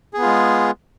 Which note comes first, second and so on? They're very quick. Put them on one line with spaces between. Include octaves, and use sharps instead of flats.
G#4 B3 F4 G#3